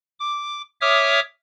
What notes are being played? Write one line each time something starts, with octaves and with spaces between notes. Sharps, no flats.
D6
C#5 E5 D6 D#6 F6